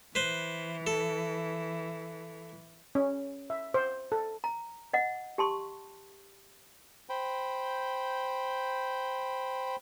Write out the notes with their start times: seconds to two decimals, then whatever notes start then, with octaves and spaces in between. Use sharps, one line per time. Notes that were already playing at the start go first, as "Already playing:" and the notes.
0.15 E3 B4 C5
0.87 A4
2.95 C#4
3.50 E5
3.74 C5
4.12 A4
4.44 A#5
4.94 D#5 F#5
5.38 G4 A5 C6 C#6
7.09 C5 G5 B5